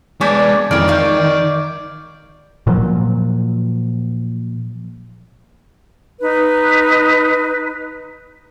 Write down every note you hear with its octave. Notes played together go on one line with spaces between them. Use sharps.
G#3 B3 D4 C#5 D5 G#5 G6
F2 D#3 E3 G#3 C#5 D5 F5
C#5 F5 C#6 G6
A#2 F3 F#3
D#4 B4